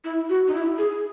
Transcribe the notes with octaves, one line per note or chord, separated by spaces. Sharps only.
E4
F#4
D#4
E4
G#4